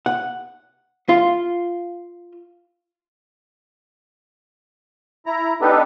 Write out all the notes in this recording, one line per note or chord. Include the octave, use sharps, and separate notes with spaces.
F#5
F4
E4 A#5
B3 D4 D#4 G4 A4 B4